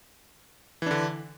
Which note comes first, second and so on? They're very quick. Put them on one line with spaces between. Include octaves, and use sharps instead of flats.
E3 D4 D3